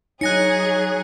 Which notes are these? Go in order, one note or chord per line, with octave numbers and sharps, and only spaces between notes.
F#3 D#4 G#4 C#5 F#6 A#6 C#7